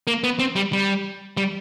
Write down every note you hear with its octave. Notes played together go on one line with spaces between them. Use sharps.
A#3
B3
C4
G3
G3
G3